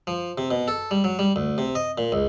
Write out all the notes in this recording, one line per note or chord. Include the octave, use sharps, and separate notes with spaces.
F3
C3
B2
A4
G3
F#3
G3
D2
C3
D#5
A#2
C#2